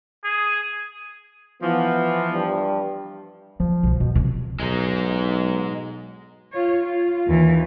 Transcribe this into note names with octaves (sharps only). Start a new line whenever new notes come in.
G#4
E3 F3 B3
G2
D#2 F3
B1 F#2
D#2 B2
C#2 C3 C4
B1 G#3 D#4
F4 C#5
F4
D#2 E3